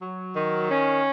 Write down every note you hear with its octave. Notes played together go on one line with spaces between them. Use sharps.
F#3
D#3
C#4